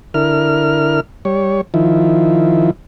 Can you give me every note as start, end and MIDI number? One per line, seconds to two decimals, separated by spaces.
0.14 1.00 50
0.14 1.00 64
0.14 1.00 70
0.14 1.00 89
1.25 1.61 55
1.25 1.61 73
1.74 2.71 51
1.74 2.71 53
1.74 2.71 64